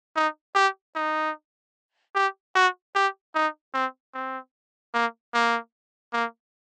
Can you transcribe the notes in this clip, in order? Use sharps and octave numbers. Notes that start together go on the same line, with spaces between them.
D#4
G4
D#4
G4
F#4
G4
D#4
C4
C4
A#3
A#3
A#3